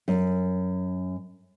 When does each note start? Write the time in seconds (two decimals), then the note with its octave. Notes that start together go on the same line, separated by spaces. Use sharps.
0.08 F#2